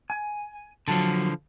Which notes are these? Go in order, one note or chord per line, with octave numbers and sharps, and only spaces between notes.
G#5
D3 F3 F#3 A5